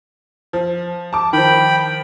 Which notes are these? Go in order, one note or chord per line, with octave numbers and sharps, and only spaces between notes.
F3
A5 D6
D#3 F3 G5 B5